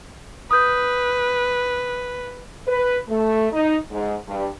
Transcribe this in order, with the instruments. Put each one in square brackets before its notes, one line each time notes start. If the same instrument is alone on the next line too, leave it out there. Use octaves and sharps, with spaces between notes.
[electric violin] B4 [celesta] D#6 G6
[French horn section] B4
A3
D#4
G#2
G2